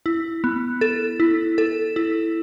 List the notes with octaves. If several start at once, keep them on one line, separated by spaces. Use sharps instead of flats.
E4
B3
A4
E4
A4
E4